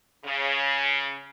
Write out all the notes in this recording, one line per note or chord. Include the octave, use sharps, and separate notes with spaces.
C#3